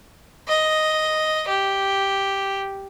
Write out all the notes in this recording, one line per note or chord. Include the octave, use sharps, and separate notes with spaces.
D#5
G4